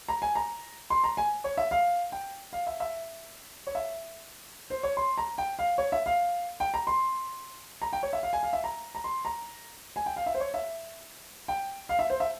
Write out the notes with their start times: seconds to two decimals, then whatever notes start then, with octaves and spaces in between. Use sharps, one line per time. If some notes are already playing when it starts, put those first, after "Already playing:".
0.08 A#5
0.22 G#5
0.35 A#5
0.90 C6
1.04 A#5
1.17 G#5
1.44 C#5
1.57 E5
1.71 F5
2.12 G5
2.53 F5
2.67 E5
2.80 E5
3.67 C#5
3.75 E5
4.70 C5
4.83 C#5
4.97 C6
5.18 A#5
5.38 G5
5.59 F5
5.78 C#5
5.92 E5
6.06 F5
6.60 G5
6.74 A#5
6.87 C6
7.82 A#5
7.93 G5
8.03 C#5
8.13 E5
8.23 F5
8.33 G#5
8.43 F5
8.53 E5
8.64 A#5
8.95 A#5
9.04 C6
9.25 A#5
9.96 G#5
10.06 G5
10.16 F5
10.26 E5
10.34 C5
10.40 C#5
10.54 E5
11.48 G5
11.89 F5
11.99 E5
12.10 C5
12.20 E5